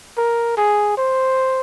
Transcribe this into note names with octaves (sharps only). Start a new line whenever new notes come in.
A#4
G#4
C5